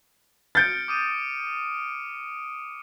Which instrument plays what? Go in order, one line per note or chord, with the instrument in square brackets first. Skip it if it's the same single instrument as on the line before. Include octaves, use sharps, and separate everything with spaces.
[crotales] F6 C#7 D7 [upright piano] G6 A6
[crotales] D6 D#6 D#7